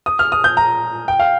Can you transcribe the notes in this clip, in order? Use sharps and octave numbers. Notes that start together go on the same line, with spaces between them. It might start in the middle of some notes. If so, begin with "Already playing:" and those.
D#6
F6
D#6
G6
A#5
G5
F5